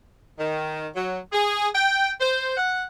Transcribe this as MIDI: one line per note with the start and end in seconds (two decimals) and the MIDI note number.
0.39 0.87 51
0.95 1.19 54
1.32 1.67 68
1.75 2.11 79
2.21 2.55 72
2.57 2.83 78